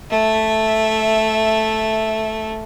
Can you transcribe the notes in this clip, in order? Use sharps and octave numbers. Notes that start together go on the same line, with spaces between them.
A3 E5